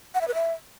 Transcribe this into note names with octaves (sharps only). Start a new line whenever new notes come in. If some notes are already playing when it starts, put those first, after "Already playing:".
F#5
E5
B4
E5